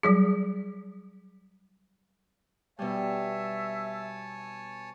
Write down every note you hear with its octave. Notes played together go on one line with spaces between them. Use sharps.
F#3 G3 G#4
B2 G3 C#5 E5 G#5 A5